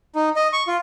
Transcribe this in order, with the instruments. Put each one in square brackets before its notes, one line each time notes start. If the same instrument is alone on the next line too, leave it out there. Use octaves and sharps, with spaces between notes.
[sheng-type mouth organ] D#4
D#5
C#6
F4